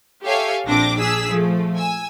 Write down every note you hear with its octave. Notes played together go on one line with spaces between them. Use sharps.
G4 A4 C#5 E5 F5 G#5
A#1 F3 C4 D4 D6 A#6
D4 G#4 E6 B6
F3 A3
G#5 E6